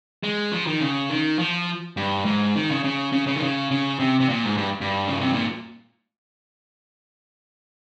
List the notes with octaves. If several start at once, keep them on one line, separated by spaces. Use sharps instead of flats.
G#3
F3
D#3
C#3
D#3
F3
G2
G#2
D#3
C#3
C#3
C#3
C#3
D#3
C#3
C#3
C3
C3
A#2
G#2
G2
G2
C#3
C3
A#2